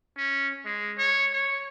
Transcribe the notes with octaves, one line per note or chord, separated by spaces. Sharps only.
C#4
G#3
C#5
C#5